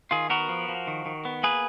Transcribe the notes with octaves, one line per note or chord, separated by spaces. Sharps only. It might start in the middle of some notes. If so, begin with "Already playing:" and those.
D#3 F4 G#4
B3 F#4 A#4
F3
F3
D#3
D#3
B3
A#3 G#4 B4